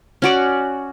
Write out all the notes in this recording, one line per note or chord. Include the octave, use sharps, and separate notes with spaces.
C#4 F#4 D5